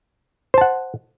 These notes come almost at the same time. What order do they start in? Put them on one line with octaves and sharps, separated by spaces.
C5 A5 F#5